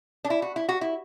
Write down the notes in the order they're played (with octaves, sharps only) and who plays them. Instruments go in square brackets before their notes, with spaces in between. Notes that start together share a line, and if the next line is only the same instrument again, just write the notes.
[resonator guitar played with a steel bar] D4
E4
F#4
E4
F#4
E4